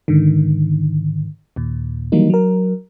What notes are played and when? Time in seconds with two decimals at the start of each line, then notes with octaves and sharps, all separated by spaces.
0.08 G#2 D3 D#3
1.56 D#2 A#2
2.12 D#3 E3 F#3 G3 A#3 D#4
2.30 F#3 A#4